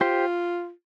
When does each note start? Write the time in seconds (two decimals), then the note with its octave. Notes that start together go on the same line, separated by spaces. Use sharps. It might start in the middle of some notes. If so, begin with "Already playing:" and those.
0.01 F4 G4 C5